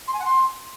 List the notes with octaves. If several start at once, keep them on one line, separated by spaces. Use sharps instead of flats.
C6
G#5
F#5
C6